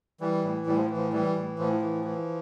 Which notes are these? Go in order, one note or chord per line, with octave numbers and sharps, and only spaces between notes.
E3 G3
A2
A2 G3
F3
E3
F3
E3 G3
A2
A2 F3
E3
E3